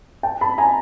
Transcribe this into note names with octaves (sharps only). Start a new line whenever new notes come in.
G5 A5
A5 B5
G#5 A#5